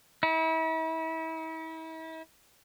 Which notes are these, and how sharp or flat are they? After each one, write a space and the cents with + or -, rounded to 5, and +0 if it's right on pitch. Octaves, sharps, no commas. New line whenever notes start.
E4 -40